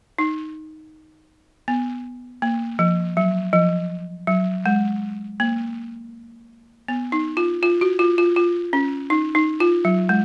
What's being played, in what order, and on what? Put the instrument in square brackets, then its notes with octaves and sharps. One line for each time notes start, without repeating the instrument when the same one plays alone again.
[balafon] D#4
B3
A#3
F3
F#3
F3
F#3
G#3
A#3
B3
D#4
F4
F4
F#4
F4
F4
F4
C#4
D#4
D#4
F4
F#3
G#3